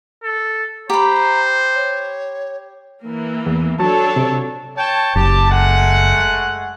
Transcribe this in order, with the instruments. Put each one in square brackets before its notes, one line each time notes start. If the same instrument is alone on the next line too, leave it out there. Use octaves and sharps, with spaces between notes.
[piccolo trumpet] A4
[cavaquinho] G4 B5 [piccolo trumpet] C5 [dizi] A#5
[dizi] C#5
[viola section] E3 A#3
[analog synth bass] E2
[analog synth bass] F#3 [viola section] D4 A4 C#5 [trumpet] A5
[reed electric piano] C3
[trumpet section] C#5 G5 A5
[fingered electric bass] F#1 [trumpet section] G4 A5
[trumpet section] G#3 A3 F#5